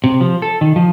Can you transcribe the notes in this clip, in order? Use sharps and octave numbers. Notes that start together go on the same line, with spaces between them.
C3
F3
A4
D#3
F3